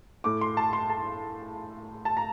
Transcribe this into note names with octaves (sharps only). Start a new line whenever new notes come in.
A2 D6
C6
A5
C6
A5
A5
A#5